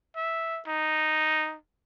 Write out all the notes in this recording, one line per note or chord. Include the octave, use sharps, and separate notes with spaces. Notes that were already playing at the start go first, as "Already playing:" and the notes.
E5
D#4